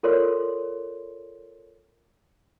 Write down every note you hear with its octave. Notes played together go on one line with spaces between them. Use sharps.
F4 A4 A#4 C#5 D5 C6